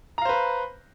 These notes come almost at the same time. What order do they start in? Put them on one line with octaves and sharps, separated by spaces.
A#5 F5 C5 B4